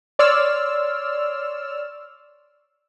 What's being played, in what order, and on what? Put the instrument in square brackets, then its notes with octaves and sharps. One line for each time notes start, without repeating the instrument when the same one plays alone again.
[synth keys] C#5 D5 C6 E6 F6